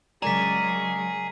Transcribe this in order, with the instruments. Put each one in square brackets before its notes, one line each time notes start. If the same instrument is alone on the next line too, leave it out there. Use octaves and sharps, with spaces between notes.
[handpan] C#3 A#4 D5 [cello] F#3 G#3 [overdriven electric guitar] G#4 [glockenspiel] A#5 B6